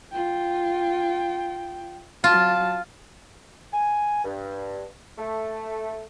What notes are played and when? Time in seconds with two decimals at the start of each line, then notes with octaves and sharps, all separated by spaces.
0.12 F4 G5
2.24 F#3 F4 A5
3.73 G#5
4.24 G2
5.19 A3